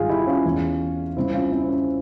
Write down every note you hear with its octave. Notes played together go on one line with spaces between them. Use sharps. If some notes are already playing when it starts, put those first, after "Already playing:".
Already playing: G#1 G#2 G3 F4 G#4
E4 G4
C#4 F4
E2 E3 G#3
C#2 C3 G3 C4 E4
C#4 F4
C4 E4
C#4